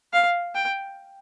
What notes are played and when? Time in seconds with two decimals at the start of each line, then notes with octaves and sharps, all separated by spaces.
0.13 F5
0.55 G5